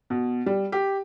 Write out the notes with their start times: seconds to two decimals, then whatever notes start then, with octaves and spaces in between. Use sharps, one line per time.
0.10 B2
0.46 G3
0.72 G4